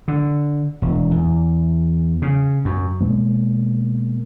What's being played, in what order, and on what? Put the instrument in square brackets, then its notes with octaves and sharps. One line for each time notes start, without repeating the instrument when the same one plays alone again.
[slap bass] D3
E1
E2
C#3
F#2
[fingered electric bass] B2 G#3 A#3